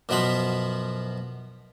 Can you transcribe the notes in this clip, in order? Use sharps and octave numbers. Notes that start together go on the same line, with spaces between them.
F#2 B2 F3 B3 B5 C6